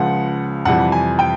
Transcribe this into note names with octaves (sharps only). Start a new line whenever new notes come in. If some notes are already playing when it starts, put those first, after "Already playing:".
Already playing: C#2 C#3 F3 F#5
F2 C3 E3 G3 F#5
G#5
G5